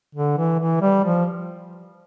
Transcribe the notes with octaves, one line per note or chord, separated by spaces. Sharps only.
D3
E3
E3
G3
F3